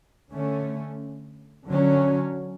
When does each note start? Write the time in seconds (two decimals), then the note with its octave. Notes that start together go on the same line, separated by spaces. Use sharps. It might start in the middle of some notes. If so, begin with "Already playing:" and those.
0.31 D3 A3 C#4
1.67 D3 F#3 C#4